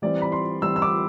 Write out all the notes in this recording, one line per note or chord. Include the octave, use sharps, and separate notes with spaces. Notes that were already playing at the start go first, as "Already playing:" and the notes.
E3 G3 C4 D5
B5
C6
E3 G3 C4 E6
E6
D6